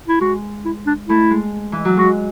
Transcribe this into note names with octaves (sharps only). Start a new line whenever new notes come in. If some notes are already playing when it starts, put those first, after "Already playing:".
E4
G#3 F#4
E4
D4
A3 E4
G#3
E3
F#3
G#3 F#4